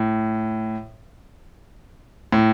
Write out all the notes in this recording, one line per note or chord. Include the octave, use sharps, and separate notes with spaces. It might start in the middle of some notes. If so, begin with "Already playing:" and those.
Already playing: A2
A2